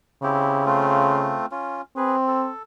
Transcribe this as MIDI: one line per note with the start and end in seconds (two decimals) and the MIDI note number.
0.23 1.39 49
0.23 0.64 60
0.23 0.64 64
0.23 0.64 67
0.66 1.46 57
0.66 1.46 60
0.66 1.46 65
1.52 1.82 61
1.52 1.82 65
1.97 2.50 60
1.97 2.16 68
1.97 2.16 71
2.28 2.62 69